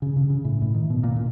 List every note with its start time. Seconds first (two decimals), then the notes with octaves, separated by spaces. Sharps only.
0.02 C#3
0.16 C#3
0.30 C#3
0.45 A2
0.62 A2
0.74 D#3
0.90 B2
1.04 A#2
1.16 A#2